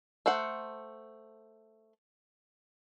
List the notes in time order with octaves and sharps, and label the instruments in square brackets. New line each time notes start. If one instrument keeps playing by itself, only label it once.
[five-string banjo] A3 C5 F#5